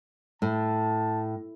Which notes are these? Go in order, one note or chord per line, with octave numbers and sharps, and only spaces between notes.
A2 A5